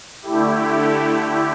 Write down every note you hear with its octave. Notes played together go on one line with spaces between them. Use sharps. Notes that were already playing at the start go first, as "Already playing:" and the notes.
D3 A3 E4 G4